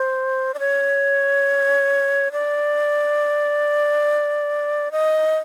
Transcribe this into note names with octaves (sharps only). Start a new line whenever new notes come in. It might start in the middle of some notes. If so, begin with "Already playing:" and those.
Already playing: C5
D5
C#5
D5
D#5